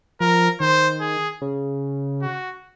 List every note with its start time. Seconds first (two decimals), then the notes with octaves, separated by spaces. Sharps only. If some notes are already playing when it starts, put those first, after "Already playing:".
0.20 F3 A#4
0.60 D#3 C5
1.01 G#4
1.41 C#3
2.22 F#4